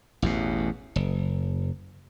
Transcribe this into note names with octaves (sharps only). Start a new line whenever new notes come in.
A1 E2 B2
F#1